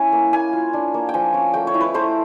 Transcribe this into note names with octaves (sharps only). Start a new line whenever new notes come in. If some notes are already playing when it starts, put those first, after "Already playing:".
Already playing: C#4 E4 G#5
A#3
A#3 G#5
F4
D4
A#3
G5
F3 G#5
C#4
A3 G5
C#5
E4
B4
A3 C5